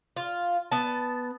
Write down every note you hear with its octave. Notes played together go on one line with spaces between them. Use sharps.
F4
B3 A5